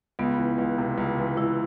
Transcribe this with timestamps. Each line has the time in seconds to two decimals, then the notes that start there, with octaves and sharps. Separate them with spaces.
0.19 C#2 B3
0.39 E3
0.58 C#2
0.78 C3
0.98 C#2
1.18 E3
1.37 C#2 E4